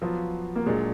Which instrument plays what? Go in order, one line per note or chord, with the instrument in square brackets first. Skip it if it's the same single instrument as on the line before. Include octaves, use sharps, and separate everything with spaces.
[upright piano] F3 [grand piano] F#3 B3 F4
[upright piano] A#3
[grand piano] A#2 F#3 A#3 D4 [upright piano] G#3